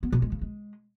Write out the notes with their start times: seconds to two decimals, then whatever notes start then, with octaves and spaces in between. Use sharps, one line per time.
0.03 B3
0.12 B2
0.22 G#3
0.32 C#3
0.41 G#3